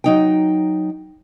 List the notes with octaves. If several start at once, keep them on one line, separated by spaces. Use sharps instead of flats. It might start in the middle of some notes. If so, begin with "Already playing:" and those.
F#3 D#4 G5